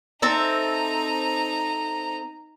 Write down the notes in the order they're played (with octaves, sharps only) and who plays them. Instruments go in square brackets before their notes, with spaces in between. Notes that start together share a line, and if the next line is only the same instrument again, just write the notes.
[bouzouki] C4 A4 E5 [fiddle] D#4 A#5